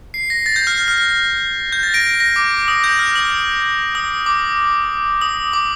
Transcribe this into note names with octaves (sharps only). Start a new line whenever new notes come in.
C7
A#6
A6
G6
F6
F6
F6
F6
G6
A6
A#6 D7
A#6
D6
D#6
G6
F6
D#6
D#6
D6
D#6
D6